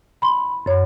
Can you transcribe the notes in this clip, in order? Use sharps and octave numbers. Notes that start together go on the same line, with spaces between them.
B5 C6
F#2 C#5